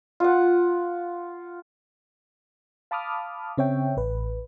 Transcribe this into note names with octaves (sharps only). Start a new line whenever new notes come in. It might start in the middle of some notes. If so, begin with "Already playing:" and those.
F4 F#5
F5 A5 B5 D6 D#6 F6
C#3 C4 C#5 E5 G5
A1 B4